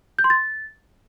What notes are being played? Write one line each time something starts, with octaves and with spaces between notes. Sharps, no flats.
G6
C6
A6